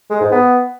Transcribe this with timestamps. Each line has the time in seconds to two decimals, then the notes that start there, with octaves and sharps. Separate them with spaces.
0.10 G#3
0.21 G#2
0.31 B3